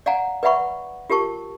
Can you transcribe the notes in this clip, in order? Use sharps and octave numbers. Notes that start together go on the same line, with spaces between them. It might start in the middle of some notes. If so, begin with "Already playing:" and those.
D5 F5 F#5 G#5 A#5
B4 D5 E5 F#5 B5 C#6
F4 G4 A#4 A5 C#6